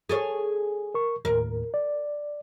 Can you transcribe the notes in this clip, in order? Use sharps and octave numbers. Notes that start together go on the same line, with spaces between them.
G#4 A4 C#5
A#4 C#6
D#2 A2 A#4
D5